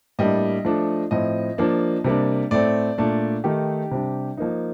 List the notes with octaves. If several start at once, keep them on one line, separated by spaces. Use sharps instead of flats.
A2 G3 A#3 D4 D#5
F3 A3 D4
A2 F3 C4 D#5
F3 A#3 D4
C3 G3 A#3 D4
A2 A3 C4 D5
A#2 A3 D4
D#3 A3 D#4 G4
C3 G3 D4
F3 A#3 D#4